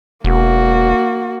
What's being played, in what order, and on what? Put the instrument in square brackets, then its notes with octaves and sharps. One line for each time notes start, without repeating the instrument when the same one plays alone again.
[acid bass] E1 [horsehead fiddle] A#3 F#4